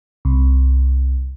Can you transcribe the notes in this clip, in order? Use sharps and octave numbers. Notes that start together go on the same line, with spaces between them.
C2